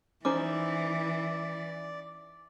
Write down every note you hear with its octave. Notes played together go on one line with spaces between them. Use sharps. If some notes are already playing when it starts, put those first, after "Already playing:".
E3 C#4 D#4 C5 D5 D6